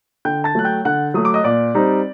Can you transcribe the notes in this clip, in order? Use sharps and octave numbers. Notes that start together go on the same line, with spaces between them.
D3 G5 G6
A5 A6
F#3 A3 F#6
G5 G6
D3 F#5 F#6
F#3 A3 D#6
D6
D#5 D#6
A#2 D5 D6
G3 C4 D#4